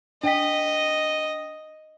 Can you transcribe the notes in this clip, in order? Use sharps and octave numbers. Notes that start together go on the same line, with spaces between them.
D4 D#5 G5 B6